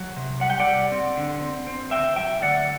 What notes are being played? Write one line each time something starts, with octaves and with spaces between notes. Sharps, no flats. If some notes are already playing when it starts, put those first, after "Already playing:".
Already playing: F#3
C3
G3 F#5
G5
D5 F#5
G3
C4
D3
C4
C4
D2 E5 G5
F#3 E5 G5
D2 D5 F#5